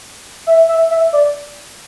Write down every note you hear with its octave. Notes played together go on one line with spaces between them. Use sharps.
E5
E5
E5
D5